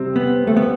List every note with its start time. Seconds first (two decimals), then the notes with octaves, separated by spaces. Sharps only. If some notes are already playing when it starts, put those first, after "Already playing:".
Already playing: C3 G3 C4
0.16 B3
0.47 A3
0.57 B3